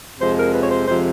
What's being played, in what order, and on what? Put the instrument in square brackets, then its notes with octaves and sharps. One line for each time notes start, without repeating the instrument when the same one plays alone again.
[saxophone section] F2 C3 F3 G#3 C5
A#4
B4
C#5
C5
F2 C3 F3 G#3 C5